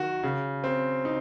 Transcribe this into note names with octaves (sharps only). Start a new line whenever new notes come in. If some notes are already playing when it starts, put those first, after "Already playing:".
Already playing: D#3 F#4
C#3
C4
D#4